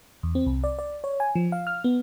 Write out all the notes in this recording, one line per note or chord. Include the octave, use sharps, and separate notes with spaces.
E2
C4
C2
D5
D5
C#5
G#5
F3
F5
F6
B3